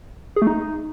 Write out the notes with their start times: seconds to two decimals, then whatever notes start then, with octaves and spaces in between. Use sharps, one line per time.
0.36 G#4
0.42 A3
0.47 D#4